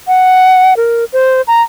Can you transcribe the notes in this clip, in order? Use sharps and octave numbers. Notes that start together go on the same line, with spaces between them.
F#5
A#4
C5
A#5